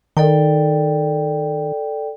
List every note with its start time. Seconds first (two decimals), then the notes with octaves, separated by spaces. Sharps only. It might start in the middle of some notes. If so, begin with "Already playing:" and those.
0.17 D#3 A4 D5 G5